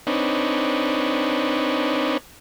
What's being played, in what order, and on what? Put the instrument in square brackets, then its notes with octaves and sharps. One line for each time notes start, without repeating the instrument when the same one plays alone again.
[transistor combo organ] C4 D4 D#4 B4 C#5